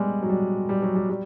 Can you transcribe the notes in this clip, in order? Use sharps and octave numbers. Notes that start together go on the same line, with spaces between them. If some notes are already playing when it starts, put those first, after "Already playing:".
Already playing: G3 G#3 B3
F#3
G3
G3
F#3
G3
G3